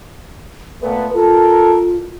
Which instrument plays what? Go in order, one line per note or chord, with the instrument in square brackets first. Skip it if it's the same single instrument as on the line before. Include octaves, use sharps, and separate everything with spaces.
[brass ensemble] A#2 A3 B3 [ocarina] B4
[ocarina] F4 [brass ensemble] A4 A#4